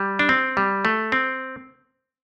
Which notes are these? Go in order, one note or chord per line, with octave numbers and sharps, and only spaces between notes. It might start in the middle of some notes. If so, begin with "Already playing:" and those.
Already playing: G3
D4
C4
G3
A3
C4